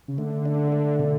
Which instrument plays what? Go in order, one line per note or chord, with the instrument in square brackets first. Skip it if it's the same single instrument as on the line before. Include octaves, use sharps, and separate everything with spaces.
[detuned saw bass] C#3
[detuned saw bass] D3 [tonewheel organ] A3
[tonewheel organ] D4
A3
[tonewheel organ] B2 [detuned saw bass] D3